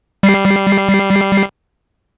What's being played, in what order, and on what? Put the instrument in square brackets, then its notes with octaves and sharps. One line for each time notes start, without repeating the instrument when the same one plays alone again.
[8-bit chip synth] G3 C7